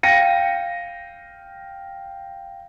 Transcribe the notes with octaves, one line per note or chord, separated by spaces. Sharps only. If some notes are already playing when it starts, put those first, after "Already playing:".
F5 G5 A#6 C#7 D#7